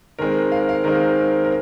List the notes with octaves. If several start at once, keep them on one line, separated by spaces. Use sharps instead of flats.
D#3 G#3 C4 A#4
F5
F5
D#3 G#3 C4 A#4
A#4